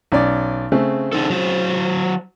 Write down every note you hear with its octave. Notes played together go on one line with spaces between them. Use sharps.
B1 C#4 D5
C#3 A3 C4
D4 D#4 A4
F#3 C5